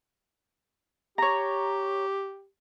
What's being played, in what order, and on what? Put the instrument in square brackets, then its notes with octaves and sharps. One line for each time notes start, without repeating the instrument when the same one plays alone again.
[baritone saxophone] G4 [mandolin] C#5 A#5